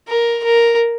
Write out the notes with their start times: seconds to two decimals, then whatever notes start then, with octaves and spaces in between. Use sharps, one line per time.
0.08 A#4
0.44 A#4